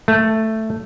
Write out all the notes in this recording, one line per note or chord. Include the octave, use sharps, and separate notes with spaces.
A3